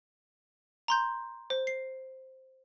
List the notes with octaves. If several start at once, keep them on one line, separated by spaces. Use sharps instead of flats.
A#5 C6 G6
C5
C7